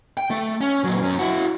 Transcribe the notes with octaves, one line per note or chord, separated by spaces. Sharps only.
G5
A3
C#4
A#2 F#3
F#2 C#4
E4 F#4